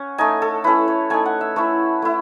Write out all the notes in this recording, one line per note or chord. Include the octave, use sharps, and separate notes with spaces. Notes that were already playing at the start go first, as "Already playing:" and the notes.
Already playing: C#4 F#5
A3 D#4 G#5
A4
A3 C#4 E4 B4
C#5
A3 D#4 G#5
F#5
E5
A3 C#4 E4 C#5
A3 E4